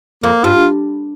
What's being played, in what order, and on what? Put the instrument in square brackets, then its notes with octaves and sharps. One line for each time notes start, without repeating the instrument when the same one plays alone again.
[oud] F2 [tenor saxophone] A#3
[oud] G2 [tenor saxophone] F4